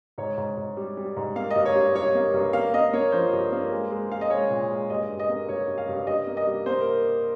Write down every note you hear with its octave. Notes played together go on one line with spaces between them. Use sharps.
G#2 C#5
G#2
G#2
G3
G3
G#2
A#3 F5
D#5
G2
C#5
G3
G2 C#5
A#3
G2
A#3 F5
A#3 D#5
A#3 C#5
F3 C5
G2
A#3
G#3
G#3
G#3 F5
D#5
G#3 C#5
A#2
G#3
G2 D#5
G2
D#5
A#3
G2 C#5
G2
F5
G2
G2 D#5
A#3
D#5
G3
A#3 C5
A#4